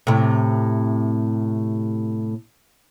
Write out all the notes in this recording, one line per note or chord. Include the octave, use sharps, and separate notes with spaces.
A2 C3